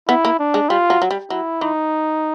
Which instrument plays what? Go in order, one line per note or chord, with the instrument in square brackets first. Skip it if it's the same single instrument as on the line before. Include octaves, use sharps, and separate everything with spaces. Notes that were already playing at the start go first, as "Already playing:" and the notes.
[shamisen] B3 [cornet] E4
[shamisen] A#3
[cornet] D4
[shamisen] G#3
[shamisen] G3 [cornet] F4
[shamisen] F#3
F#3
G3
[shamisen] F#3 [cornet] E4
[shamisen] E3 [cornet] D#4